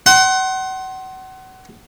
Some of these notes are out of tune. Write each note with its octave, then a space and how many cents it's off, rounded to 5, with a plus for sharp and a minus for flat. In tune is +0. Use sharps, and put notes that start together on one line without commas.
F#5 +30 C6 +15